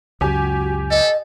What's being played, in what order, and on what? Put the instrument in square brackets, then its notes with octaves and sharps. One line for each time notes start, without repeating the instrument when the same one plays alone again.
[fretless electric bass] C#2 F#2 [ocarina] F#4 [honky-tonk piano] G4 G#5
[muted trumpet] A4 [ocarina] D#5